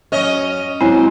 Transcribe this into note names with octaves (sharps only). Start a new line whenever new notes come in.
F#2 C#4 C#5 D#5
G#2 F#3 C4 E4 G#5